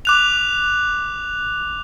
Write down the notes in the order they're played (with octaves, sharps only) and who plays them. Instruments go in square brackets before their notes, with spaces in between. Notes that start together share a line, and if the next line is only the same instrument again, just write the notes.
[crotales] D6 F#6 F7